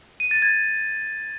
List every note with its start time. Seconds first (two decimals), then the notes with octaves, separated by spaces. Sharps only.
0.20 D#7
0.31 A6
0.42 G#6